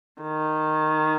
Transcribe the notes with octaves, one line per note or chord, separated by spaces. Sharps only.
D#3